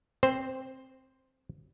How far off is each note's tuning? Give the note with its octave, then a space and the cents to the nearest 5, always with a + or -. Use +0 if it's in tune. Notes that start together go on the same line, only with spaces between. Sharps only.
C4 +10 C5 +0